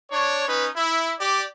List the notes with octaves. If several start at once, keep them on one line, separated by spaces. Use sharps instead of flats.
D4 C#5
C#4 D#4 B4
E4
G4 D5